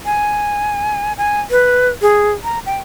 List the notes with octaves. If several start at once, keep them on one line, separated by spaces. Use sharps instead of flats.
G#5
G#5
B4
G#4
A#5
G5